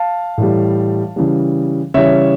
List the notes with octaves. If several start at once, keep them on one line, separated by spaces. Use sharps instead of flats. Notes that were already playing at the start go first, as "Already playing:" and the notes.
Already playing: F5 A5
A2 E3 G3
C#3 E3 G3
C#3 E3 G3 C#5 E5